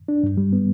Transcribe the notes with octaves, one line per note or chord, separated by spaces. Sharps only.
D4
G2
G3
B3